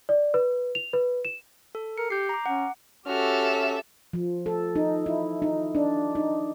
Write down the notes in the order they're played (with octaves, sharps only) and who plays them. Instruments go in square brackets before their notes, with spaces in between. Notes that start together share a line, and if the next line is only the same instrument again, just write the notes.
[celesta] D5
B4
F7
B4
E7
[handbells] A4
[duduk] A#4 [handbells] C#7
[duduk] G4 [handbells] G6 C7
[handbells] A#5 D6
[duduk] C#4 [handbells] F#5
[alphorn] C#4 [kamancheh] F#4 F6 [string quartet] G4 A4 E5
[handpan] F3
A4
D#4
E4
D#4
D4
D#4